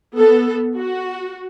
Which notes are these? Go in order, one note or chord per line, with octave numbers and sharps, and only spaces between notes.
B3 A4
F#4